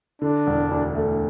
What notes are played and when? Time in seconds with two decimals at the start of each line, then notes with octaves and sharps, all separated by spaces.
0.22 D3 D4
0.47 E1
0.71 D2
0.95 A3